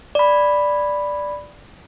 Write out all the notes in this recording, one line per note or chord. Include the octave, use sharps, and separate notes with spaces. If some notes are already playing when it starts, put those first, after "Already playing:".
D5 B5